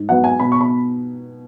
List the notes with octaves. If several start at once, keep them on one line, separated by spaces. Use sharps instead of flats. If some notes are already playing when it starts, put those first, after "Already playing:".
Already playing: G#2
F#3 B3 F#5
G#5
B2 B5
C#6
B5